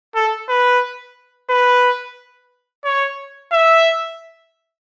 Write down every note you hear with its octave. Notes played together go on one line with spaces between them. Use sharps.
A4
B4
B4
C#5
E5